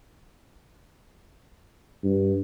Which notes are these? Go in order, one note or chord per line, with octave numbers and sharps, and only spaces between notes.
G2